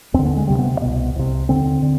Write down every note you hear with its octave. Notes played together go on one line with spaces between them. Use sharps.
D#2 C4
D3
B3
G#3
D2 C3 G3
B3
C2 B2
C2 C3
D#2 D3 C4
D3